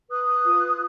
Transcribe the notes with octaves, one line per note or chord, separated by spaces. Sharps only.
B4 D#6 F#6
F4